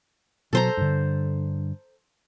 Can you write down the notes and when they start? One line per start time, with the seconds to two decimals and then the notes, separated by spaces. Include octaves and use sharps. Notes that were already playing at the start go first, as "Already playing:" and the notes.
0.53 B2 F#3 A4 C5 A#5
0.77 G2 D3